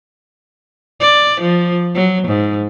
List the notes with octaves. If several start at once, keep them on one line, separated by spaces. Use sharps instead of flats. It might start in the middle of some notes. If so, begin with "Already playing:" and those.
D5
F3
F#3
G#2